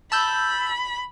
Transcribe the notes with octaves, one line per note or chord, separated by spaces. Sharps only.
A5 B5 E6 G6